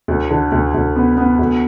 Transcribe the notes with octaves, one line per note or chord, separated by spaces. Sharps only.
D2
D3
D2
D2
B3
B3
D2